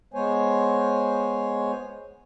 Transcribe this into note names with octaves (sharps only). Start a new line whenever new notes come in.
G#3 B3 C5 C#5 G#5